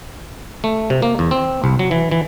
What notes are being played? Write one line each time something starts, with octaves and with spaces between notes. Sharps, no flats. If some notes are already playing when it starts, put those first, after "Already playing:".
A3
C3
A#3
E2
C4
C2
F#3
E3
E3